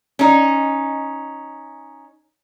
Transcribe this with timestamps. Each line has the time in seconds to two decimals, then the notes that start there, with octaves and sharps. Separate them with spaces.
0.19 C#4 D#4